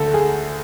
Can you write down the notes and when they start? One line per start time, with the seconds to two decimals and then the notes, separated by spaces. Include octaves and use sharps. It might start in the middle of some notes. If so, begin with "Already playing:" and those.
Already playing: D2 A4
0.14 G#4